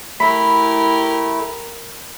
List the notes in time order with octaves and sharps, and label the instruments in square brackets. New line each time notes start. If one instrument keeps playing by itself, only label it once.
[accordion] A3 E4 [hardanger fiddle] G4 A#4 [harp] B5